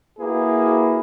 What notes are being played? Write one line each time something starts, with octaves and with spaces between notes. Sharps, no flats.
A#3 E4 F#4 G#4 B4